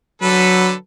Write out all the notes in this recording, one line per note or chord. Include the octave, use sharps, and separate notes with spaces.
D3 F#3 A4 B4